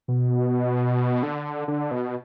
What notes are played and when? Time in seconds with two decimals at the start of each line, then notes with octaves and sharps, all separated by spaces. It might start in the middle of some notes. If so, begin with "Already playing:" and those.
0.08 B2
1.23 D3
1.68 D3
1.91 B2